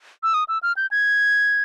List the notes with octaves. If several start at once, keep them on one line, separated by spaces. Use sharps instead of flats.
E6
D#6
E6
F6
G6
G#6